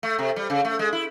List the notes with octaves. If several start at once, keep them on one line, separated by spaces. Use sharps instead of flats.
A3
C3
G3
C#3
A3
G#3
E4